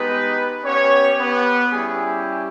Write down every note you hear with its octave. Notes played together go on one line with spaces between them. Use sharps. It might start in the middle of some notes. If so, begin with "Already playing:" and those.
Already playing: G#3 B3 D#4 G4 B4
B3 C#4 G4 C#5
B3 B4
G3 C#4 E4 G4 G#4